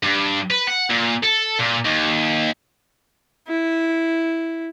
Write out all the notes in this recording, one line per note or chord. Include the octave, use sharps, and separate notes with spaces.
G2
B4
F#5
A#2
A4
A#2
D#2
E4